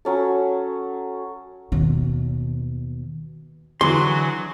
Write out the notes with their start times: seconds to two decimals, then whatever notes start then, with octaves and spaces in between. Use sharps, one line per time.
0.05 F#3 C#4 A4
1.72 D#2 B2
3.81 D3 E3 F#3 G#4 C6